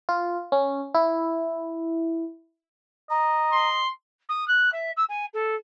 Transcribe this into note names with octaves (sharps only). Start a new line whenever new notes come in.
F4
C#4
E4
D#5 A#5
C6
D#6
F#6
E5
E6
G#5
A4